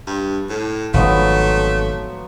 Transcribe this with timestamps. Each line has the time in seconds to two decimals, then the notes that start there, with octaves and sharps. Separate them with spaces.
0.07 G2
0.49 A2
0.94 G#1 F3 F#3 A3 B3